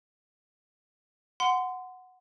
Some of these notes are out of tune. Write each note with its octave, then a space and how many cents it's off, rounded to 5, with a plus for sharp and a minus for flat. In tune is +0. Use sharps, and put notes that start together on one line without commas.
F#5 -5 C6 -25